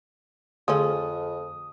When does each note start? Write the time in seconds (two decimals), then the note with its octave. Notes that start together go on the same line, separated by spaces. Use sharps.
0.68 F2 D3 F3 A3 C#4 G#4 D#6